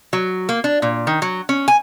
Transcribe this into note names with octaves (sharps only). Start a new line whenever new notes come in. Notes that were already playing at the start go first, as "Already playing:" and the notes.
F#3
A#3
D4
A#2
D#3
F#3
C#4
G#5